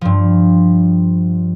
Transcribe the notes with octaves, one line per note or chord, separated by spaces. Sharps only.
G2 F3